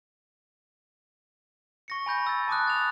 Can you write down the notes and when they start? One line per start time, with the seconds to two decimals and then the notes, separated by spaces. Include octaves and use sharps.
1.88 C#6 A#6 C#7
2.06 G#5 B5 G6 A#6
2.27 E6 A6
2.48 A5 D6 D#6 F#6
2.67 A6 F7